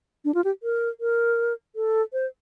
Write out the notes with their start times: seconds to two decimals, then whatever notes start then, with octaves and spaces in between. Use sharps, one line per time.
0.25 D4
0.34 F4
0.44 G4
0.63 A#4
1.00 A#4
1.76 A4
2.13 C5